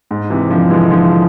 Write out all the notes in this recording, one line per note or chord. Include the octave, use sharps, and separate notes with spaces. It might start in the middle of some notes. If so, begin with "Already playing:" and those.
G#2
C3 E3
D3 F3
E3 G#3
D3 F3